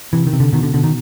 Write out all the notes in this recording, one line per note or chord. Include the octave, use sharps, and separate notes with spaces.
C3 E3
D#3
C3
D3
B2 D#3
D3
B2 D3
D#3